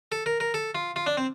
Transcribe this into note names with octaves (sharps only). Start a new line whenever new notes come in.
A4
A#4
A#4
A4
F4
F4
D4
C4